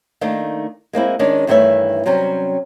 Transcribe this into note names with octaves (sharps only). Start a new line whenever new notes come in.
D#3 A3 A#3 D4 D#4
G#3 A#3 C4 E4
D#3 G#3 C#4 D4
G2 D#3 E3 A3 C#5 E5
C3 F#3 G3 C#4